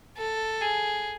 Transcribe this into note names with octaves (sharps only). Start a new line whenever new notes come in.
A4
G#4